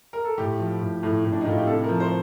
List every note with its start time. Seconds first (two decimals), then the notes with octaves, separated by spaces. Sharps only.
0.13 A#4
0.25 A4
0.38 A2 G4
0.59 F3
0.80 A2
1.03 A2
1.24 A2
1.32 D4
1.41 D#4
1.45 A2 F4
1.58 G4
1.67 C3 A4
1.84 A#4
1.89 F3
2.00 C5